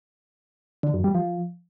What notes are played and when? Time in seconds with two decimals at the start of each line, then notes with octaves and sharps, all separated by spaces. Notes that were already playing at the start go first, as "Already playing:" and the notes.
0.83 D3
0.94 F#2
1.04 G3
1.15 F3